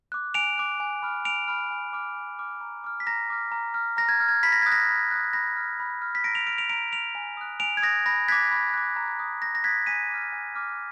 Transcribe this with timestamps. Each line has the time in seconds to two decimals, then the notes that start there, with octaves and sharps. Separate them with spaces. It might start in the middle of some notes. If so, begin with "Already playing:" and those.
0.12 D6 F#6
0.34 G#5 D7 F7
0.58 D6 F#6
0.80 G#5
1.02 B5 F6
1.25 G#5 D7 F7
1.48 B5 F6
1.71 G#5
1.93 D6 F6
2.16 G#5
2.39 D6 F6
2.61 A#5
2.84 D6 F6
3.00 B6
3.07 A#5 A#6
3.30 D6 F6
3.52 A#5
3.74 F6
3.97 A#5 A#6
4.09 G#6
4.20 F6
4.28 G#6
4.43 B5 B6
4.52 A#6
4.62 D#6 F#6 G#6
4.72 A#6
4.89 B5
5.11 D#6 F#6
5.33 B5 A#6
5.57 F6
5.80 B5
6.02 F6
6.15 B6
6.24 A#5 A#6 D7
6.35 D7 F7
6.46 F6 D7 F7
6.58 D7 F7
6.69 A#5 D7 F7
6.92 F6 D7 F7
7.15 G#5
7.37 D#6 F#6
7.60 G#5 D7 F7
7.77 G#6
7.82 D#6 F#6 A#6
8.06 B5 A#6
8.28 D6 F#6 G#6 B6
8.51 B5
8.73 D6 F#6
8.96 A#5
9.19 D#6 F#6
9.42 A#5 A#6
9.55 A#6
9.64 D#6 F#6 G#6 B6
9.87 G#5 B6 D#7
10.10 D6 F6
10.32 G#5
10.55 D6 F6